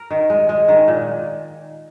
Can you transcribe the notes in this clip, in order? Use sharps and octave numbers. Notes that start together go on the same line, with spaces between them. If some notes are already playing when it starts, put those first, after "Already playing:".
Already playing: A#4
D#3
G#3
G#3
D#3
A#2